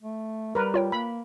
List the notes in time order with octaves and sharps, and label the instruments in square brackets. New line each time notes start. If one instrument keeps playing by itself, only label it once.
[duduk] A3
[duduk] G3 [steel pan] A#4 B4
[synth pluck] F4 C#5 G5
[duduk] A#3 [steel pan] B5